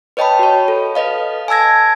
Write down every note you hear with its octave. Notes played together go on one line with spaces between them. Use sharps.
B4 C#5 D#5 G5 A5 B5
F#4 C#5
A4
A4 B4 D#5 F5
G#5 A5 E6 G#6 A#6